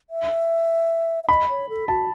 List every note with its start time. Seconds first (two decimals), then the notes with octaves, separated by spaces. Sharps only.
0.10 E5
1.24 E5
1.29 D#5 B5
1.49 C#5
1.69 A4
1.88 F#4 A5